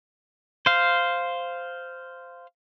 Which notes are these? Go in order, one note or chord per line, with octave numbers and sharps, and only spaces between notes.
C5 F5